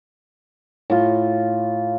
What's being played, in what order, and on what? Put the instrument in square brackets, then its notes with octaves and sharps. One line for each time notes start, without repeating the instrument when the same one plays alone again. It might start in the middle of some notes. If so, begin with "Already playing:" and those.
[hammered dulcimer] A2 F4